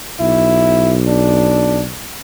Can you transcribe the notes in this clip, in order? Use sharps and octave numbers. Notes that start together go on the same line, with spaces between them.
B1 E4
D4